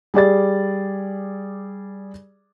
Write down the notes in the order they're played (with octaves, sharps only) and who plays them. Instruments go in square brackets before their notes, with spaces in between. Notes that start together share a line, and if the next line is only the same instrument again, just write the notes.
[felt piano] G3 G#4 D5 A6